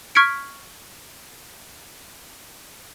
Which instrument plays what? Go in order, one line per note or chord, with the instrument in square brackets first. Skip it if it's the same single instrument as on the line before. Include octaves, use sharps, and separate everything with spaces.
[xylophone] C#6 F6 G#6 B6 C#7 D7